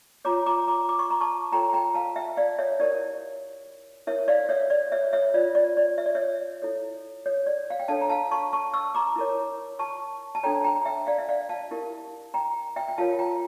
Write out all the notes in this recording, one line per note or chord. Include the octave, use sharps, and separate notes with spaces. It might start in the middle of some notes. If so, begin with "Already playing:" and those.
F4 C#5 A#5 D6
A#5 D6
A#5 D6
D6
C#6
A#5
A5 C#6
F4 A4 C#5 G5 A#5
G5 A#5
F5 A5
E5 G5
D5 F5
C#5 E5
E4 G4 A#4 C#5 D5
E4 A#4 C#5 E5
D5 F5
C#5 E5
D5
C#5 E5
C#5 E5
F4 C#5 D5
D5
D5
E5
D5
C#5 E5
E4 A4 C#5
C#5
D5
F5
G5
D4 A4 C#5 F5 A5
A#5
F5 A5
A5 C#6
A5 C#6
C#6 E6
A#5 D6
E4 A#4 C#5
A5 C#6
A5
D4 A4 C#5 G5 A#5
G5 A#5
E5 G5
D5 F5
E5
D5 F5
F5 A5
E4 G4 A#4
G5 A#5
E5 G5
G5
F4 A#4 C#5 F5 A5
G5 A#5